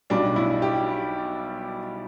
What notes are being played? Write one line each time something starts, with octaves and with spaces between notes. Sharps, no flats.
B1 B2 G3 D4
E4
G4